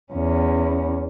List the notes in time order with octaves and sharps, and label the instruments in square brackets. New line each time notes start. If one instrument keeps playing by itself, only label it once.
[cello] E2 C#4